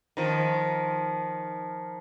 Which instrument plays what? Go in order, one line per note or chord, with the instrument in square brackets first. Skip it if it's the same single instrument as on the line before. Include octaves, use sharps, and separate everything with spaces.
[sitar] D#3 F3